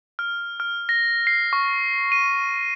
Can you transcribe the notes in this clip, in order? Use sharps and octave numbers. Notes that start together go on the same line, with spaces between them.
F6
F6
A#6
C7
C#6
D#7